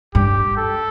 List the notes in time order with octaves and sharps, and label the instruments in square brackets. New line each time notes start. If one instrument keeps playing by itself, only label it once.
[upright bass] G2 [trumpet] G4
[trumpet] A4